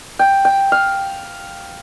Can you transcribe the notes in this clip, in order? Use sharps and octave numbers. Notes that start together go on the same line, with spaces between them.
G5
G5
F5